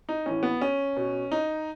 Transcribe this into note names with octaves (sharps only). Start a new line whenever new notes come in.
D#4
A2 E3 C#4
B3
C#4
B2
D#4